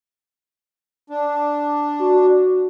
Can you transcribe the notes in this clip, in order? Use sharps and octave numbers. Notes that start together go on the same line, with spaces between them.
D4
F#4